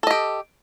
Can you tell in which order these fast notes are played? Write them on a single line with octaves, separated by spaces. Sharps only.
A4 D#5 G4